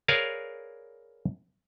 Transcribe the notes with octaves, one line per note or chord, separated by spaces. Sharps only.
G#4 A#4 B4 C#5 D5 F5